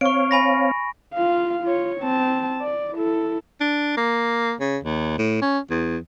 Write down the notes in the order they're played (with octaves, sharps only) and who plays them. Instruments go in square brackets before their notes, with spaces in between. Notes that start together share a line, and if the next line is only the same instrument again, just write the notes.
[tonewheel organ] C4 C#5 F5 [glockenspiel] C#6 D7
[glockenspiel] G#5 B5 A#6
[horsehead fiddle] F4 F5
F4 C#5
C4 A5
D5
E4 A4
[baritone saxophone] D4
A#3
C#3
D#2
A2
C#4
E2